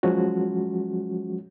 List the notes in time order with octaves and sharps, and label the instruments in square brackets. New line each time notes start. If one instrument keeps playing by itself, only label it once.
[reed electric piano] F3 F#3 G#3 C#4 F#4